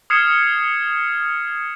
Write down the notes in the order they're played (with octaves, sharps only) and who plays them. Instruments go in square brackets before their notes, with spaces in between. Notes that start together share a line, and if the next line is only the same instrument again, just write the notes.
[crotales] D#6 F6 G#6 C7 C#7 E7